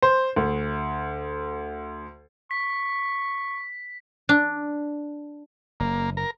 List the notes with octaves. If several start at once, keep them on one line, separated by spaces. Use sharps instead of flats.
C5
D2
C#6 B6
D4
F#1 A#3
A#4